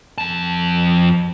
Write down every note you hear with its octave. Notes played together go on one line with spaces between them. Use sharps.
F2 A5